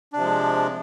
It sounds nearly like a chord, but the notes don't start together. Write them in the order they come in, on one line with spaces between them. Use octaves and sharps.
D4 C3 F3 G#3